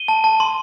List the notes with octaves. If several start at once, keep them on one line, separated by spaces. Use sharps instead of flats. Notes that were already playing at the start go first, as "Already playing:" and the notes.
Already playing: D#7 G7
A5
A5
C6